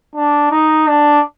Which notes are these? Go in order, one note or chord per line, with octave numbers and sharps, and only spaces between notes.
D4
D#4
D4